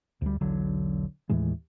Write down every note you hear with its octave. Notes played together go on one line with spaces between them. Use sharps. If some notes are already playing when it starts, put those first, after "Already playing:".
D2 G3
E1 B1 D3 F#3
D#2 A2 E3 G#3